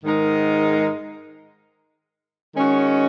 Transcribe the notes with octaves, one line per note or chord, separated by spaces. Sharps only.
G#2 D#3 G#3 D#4 A#4
D#3 G#3 C#4 F#4